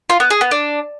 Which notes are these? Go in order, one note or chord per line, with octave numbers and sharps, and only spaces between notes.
F4
B3
G#4
B3
D4